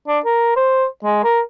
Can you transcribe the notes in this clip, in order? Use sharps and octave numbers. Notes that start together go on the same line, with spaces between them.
D4
A#4
C5
G#3
A#4